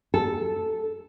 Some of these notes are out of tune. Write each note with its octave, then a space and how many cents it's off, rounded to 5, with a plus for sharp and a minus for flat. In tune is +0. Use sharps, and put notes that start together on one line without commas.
A4 -5